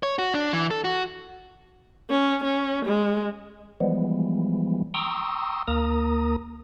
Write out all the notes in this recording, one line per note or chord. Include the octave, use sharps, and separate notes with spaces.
C#5
F#4
D4
E3
A4
F#4
C#4
C#4
G#3
E3 F3 G3 G#3 B3
G5 A#5 C6 C#6 D#6 E6
D2 A#3 A#4 A#5 D#6